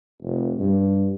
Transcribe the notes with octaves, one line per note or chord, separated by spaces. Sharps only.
F1
G2